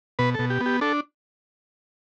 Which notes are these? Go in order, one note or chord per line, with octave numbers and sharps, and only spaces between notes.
B2 B4
B2 A4
G4
B3
G4
D4 A4